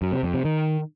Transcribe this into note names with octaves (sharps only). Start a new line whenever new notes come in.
F#2
C3
F2
C3
D#3